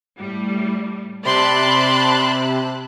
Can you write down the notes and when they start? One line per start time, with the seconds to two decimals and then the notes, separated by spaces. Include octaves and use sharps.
0.18 A2 G3
1.25 C3 D5 A5 B5 C6 F#6